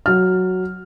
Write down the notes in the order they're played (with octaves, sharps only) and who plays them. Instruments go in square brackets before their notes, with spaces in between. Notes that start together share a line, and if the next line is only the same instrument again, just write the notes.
[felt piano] F#3 F6